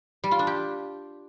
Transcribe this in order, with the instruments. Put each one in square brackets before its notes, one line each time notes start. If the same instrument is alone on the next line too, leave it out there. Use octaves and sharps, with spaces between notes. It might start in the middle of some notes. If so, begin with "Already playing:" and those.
[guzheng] G3
F4
D4
G4